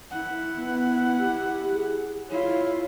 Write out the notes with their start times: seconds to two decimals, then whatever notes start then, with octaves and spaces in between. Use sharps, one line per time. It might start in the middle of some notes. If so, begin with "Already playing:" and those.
0.11 E4 F#5
0.56 B3
1.18 G4
1.73 G#4
2.30 E4 F4 C#5